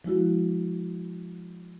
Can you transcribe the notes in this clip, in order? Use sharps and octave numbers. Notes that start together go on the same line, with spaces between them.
F3 G#3 E4 F#4